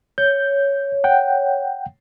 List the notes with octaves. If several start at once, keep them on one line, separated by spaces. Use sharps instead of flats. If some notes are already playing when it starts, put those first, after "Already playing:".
C#5 G6
F#5 G5